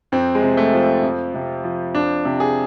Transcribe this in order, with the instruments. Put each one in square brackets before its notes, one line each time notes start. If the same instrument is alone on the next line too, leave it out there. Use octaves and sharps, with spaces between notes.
[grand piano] F2 C4
G#3
C3
A3
F3
F2
C3
F3
F2 D4
C3
G#4